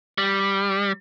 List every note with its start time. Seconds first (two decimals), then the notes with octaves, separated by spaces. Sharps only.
0.18 G3